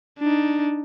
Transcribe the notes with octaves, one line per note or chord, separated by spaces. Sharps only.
D4 D#4